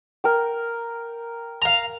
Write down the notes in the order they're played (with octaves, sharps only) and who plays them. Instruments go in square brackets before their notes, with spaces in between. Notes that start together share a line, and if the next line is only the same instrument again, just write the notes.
[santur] A#4 G5
[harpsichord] F5 A#5